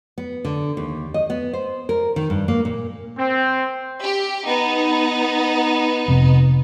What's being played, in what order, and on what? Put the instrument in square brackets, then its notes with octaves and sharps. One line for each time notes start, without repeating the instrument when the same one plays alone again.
[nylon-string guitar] B3
D3
D#2
D#5
B3
C5
A#4
D#3
G2
A#3
A#2
[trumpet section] C4
[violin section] G4
B3 D#4
[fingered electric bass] F1 F2 C3